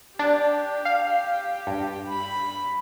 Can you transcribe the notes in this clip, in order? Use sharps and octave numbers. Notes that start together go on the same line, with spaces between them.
D4 G4
F5
G2
B5